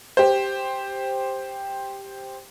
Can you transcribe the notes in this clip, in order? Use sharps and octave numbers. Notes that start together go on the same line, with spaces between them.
G4 C5